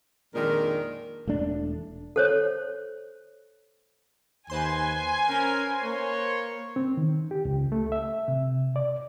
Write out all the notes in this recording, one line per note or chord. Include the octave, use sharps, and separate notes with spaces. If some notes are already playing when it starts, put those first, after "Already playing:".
F2 A#2 D#3 G#3 D4 A#4
E1 A3 D4
A4 C5 C#5
D#2 B4 C5 G#5 C6
C#4 A#4
A#3 C#5
C4
D#3
G4
C#2
A3
E5
C3
D5